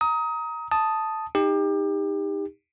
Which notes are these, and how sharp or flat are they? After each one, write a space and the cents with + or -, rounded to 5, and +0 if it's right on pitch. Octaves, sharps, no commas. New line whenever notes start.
A#5 +0 D#6 +25
A5 +0 D#6 +0
D#4 +0 G4 +30